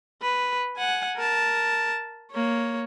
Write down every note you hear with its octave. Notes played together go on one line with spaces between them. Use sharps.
B4
F#5 G#5
A#4 A5
A#3 C#5